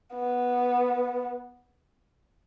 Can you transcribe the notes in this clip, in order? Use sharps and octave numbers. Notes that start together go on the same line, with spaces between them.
B3